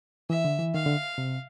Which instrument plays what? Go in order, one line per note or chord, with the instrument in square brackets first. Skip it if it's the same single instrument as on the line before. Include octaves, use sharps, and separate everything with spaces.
[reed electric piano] E3 [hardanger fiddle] E5
[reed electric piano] D3
E3
[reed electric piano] D#3 [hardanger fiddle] F5
[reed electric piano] D3
C3